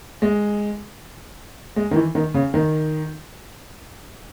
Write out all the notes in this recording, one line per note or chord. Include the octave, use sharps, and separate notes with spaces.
G#3
G#3
D#3
E3
D#3
C#3
D#3